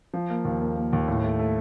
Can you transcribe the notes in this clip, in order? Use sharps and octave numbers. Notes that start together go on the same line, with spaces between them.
F3
A#3
D#2
A#3
A#3
D#2
A2
A3
A3